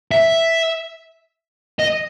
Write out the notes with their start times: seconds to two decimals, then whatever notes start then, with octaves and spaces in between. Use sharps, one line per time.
0.12 E5
1.79 D#5